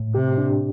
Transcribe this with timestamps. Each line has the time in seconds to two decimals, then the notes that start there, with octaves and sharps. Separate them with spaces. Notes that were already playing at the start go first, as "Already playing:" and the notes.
Already playing: A2
0.15 C3 G4
0.38 D4